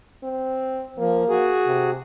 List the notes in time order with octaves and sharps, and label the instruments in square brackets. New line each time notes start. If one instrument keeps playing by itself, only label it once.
[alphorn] C4
[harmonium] F3 [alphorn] A#3
[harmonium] F#4 G#4
[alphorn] C3